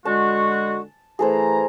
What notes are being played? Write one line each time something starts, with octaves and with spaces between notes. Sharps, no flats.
D3 G#3 F#4 A5
E3 A3 G#4 A4 C5 A#5